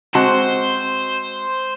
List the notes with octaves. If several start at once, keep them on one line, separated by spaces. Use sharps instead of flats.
G#3 C4 F#4 C5 A5